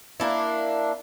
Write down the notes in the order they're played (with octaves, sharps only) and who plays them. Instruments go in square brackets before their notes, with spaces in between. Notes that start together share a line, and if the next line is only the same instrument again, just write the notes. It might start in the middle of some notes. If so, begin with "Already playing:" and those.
[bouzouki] A#3 D4 E4